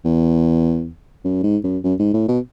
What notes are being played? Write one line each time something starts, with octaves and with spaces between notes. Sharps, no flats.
E2
F#2
G#2
F#2
F#2
G#2
A2
B2